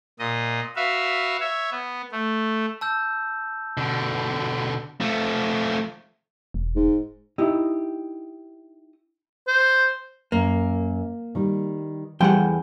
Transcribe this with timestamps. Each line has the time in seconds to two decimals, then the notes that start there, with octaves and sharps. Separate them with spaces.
0.19 A#2 D#5
0.76 F#4 B4 E5 F5
1.40 C#5 E5
1.71 B3
2.12 A3
2.81 A5 E6 G6
3.77 B2 D3
5.01 F3 A3
6.54 E1
6.76 G#2
7.38 D#4 E4 G4 D#5
9.47 C5
10.32 F#2 A#3
11.35 D#3 G3
12.20 E2 F3 G3 A4 F#5 G5